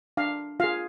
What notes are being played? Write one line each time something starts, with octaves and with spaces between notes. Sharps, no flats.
D4 F5
F4 G#4 F5